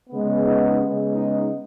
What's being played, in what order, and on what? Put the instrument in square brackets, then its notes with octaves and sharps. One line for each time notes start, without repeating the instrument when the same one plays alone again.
[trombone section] C#3 G#3 B3
D#4
C#3 G#3 B3
D#4